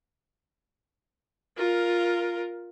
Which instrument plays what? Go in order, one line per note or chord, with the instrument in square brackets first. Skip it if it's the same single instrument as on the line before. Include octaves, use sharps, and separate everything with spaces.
[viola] F4 A#4